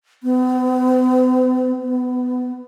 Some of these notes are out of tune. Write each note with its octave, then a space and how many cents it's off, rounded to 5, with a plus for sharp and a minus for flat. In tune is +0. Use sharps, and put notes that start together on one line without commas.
B3 +45
B3 +20